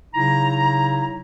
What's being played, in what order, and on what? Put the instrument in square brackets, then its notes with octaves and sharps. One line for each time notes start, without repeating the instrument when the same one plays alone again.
[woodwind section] C#3 F#3 D#4 E4 A#5